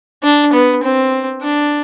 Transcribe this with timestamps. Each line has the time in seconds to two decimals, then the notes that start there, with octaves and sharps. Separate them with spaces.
0.23 D4
0.53 B3
0.83 C4
1.42 D4